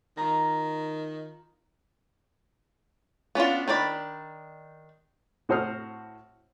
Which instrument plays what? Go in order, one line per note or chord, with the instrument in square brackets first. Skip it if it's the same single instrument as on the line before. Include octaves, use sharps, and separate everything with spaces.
[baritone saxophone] D#3 [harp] F4 A#5
[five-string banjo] B3 C#4 D4 F4
D#3 D4 D5 B5
[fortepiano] A2 F#4 C5 D#6 F6